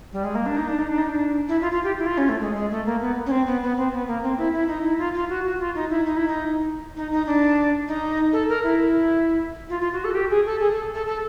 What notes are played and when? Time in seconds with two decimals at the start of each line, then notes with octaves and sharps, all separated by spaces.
0.13 G3
0.24 G#3
0.35 A#3
0.46 D4
0.57 D#4
0.68 D4
0.78 D#4
0.89 D4
0.98 D#4
1.09 D4
1.49 E4
1.61 F4
1.72 F4
1.84 G4
1.98 E4
2.06 F4
2.18 C#4
2.29 A3
2.41 G#3
2.55 G#3
2.71 A3
2.86 A#3
3.01 B3
3.26 C#4
3.31 C4
3.47 B3
3.62 B3
3.77 C4
3.93 B3
4.08 A#3
4.23 C4
4.38 E4
4.53 E4
4.68 D#4
4.83 E4
4.98 F4
5.14 F4
5.29 F#4
5.44 F#4
5.60 F4
5.75 D#4
5.90 E4
6.05 D#4
6.17 E4
6.28 D#4
6.97 D#4
7.12 D#4
7.26 D4
7.88 D#4
8.33 A4
8.49 A#4
8.63 E4
9.70 F4
9.81 F4
9.93 F#4
10.04 A4
10.10 F#4
10.15 G4
10.30 G#4
10.46 A4
10.60 G#4
10.72 A4
10.95 A4
11.07 A4